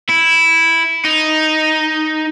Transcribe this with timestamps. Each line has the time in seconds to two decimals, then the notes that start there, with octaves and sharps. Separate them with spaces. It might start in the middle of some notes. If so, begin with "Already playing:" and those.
0.09 E4
1.05 D#4